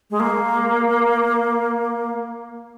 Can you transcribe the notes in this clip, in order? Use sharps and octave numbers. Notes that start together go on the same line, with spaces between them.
G#3
A#3